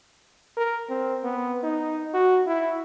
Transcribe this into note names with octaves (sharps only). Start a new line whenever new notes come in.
A#4
C4
B3
D#4
F#4
E4